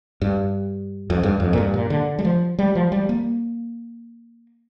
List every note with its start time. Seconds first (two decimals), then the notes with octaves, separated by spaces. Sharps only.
0.21 G2
1.10 F2
1.23 G2
1.40 F2
1.53 A#2
1.58 G2
1.74 A#2
1.90 D3
2.19 G3
2.25 F3
2.59 G3
2.75 F3
2.92 G3
3.09 A#3